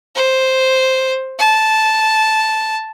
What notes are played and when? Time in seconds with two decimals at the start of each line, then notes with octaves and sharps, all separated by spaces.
0.15 C5
1.39 A5